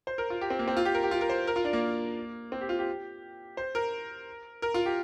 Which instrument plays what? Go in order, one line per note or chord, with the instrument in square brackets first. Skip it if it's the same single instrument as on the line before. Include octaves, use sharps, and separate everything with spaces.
[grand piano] C5
A#4
F4
G4
C4
A#3
C4
F4
G4
A#4
G4
F4
A#4
C5
A#4
F4
D4
A#3
C4
G4
F4
G4
C5
A#4
A#4
F4
G4